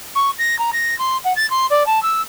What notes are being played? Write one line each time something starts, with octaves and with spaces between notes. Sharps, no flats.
C#6
A#6
A#5
A#6
C6
F#5
A6
C6
D5
A5
E6